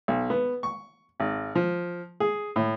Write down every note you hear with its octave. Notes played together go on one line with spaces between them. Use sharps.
B1
B3
C#6
G#1
F3
G#4
A2